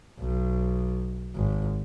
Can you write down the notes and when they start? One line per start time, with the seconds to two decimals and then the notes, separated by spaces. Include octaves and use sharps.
0.19 B1
1.35 G#1